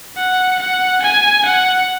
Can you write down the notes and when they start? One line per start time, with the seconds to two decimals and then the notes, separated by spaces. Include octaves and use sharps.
0.17 F#5
0.59 F#5
1.02 G#5
1.45 F#5